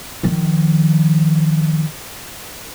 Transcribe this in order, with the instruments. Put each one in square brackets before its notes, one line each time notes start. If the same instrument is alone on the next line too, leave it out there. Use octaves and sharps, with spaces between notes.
[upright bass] D#3 F3